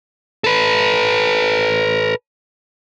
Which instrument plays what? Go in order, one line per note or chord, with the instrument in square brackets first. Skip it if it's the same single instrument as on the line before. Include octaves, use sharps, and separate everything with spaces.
[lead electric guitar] A4 B4